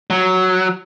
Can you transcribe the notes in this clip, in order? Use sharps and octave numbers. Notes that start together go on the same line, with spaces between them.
F#3